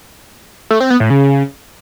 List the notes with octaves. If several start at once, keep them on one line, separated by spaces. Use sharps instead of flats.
A3
C4
B3
A2
C#3